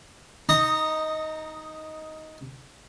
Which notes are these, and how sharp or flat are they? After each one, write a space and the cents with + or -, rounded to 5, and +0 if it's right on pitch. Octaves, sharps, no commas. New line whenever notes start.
D#4 +10 A#5 -25 D#6 +0